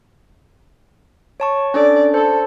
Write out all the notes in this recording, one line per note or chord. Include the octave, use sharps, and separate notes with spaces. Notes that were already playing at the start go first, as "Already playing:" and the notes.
C#5 A5 C#6
C#4 D4 A4 D5
A4 C5